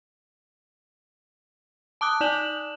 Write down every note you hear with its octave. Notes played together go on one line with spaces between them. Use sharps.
A5 D6 D#6 F#6
D#4 D5 E7 F#7